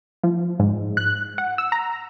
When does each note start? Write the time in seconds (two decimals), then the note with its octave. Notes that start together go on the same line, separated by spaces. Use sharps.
0.23 F3
0.60 G#2
0.97 F#6
1.38 F#5
1.58 E6
1.72 A#5